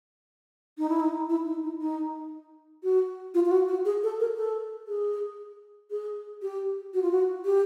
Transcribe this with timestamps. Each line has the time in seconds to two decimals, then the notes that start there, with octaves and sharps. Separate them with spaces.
0.78 D#4
0.89 E4
1.00 D#4
1.29 E4
1.46 D#4
1.63 D#4
1.81 D#4
2.83 F#4
3.34 F4
3.45 F4
3.51 F#4
3.68 F#4
3.85 G#4
4.03 A4
4.20 A#4
4.37 A4
4.88 G#4
5.91 G#4
6.42 G4
6.94 F#4
7.02 F4
7.11 F#4
7.45 G4